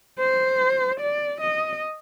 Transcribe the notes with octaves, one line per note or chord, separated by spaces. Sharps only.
C5
D5
D#5